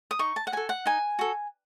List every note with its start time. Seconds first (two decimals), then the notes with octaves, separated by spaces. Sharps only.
0.11 D#6
0.19 D#4 C#6
0.36 A5
0.47 F#5
0.52 F#4 A4 G#5
0.69 F#5
0.86 D#4 G#5
1.19 F#4 A4